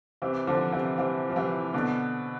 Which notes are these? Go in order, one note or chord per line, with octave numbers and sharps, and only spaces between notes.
C3 E3
D3 F3
C3 E3
C3 E3
F3
C3 E3
B2 D3